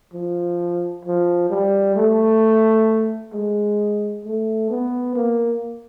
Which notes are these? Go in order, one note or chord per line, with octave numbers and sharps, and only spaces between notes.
F3
F3
G3
A3
G#3
A3
B3
A#3